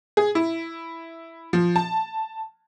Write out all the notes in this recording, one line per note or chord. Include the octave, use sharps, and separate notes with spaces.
G#4
E4
F3
A5